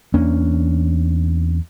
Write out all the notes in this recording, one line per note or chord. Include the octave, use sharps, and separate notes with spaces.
E2 A#3 C#4 D4